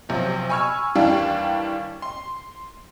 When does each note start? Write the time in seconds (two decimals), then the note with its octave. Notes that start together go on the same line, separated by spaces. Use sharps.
0.09 B1 C3 F3
0.49 G#5 B5 C#6 E6 F6 G#6
0.95 D#2 E3 G3 D4 F5
2.02 C6